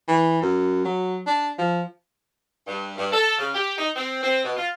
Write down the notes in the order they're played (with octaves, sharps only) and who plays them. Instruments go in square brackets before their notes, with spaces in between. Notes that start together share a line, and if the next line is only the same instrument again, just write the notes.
[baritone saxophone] E3
F#2
F#3
D4
F3
[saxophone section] G2
G2
A4
C#3
G4
D#4
C4
C4
B2
F4